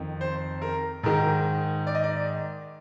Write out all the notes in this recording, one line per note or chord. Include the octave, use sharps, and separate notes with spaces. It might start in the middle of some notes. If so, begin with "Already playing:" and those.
Already playing: F2 D#3
C5
A#4
G#2 D#3 A#4
D5
D#5
D5